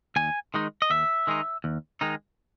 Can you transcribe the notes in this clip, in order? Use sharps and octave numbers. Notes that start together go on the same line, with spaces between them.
D#2 G#5
D#3 G#3 D#4
D#5
D#2 E5
D#3 G#3 D#4
D#2
D#3 G#3 D#4